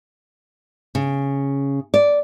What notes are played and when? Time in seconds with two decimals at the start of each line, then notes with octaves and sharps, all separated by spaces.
0.95 C#3
1.94 D5